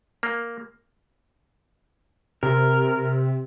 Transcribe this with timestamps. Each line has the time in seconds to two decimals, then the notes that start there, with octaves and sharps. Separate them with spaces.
0.23 A#3
2.43 C3 A#4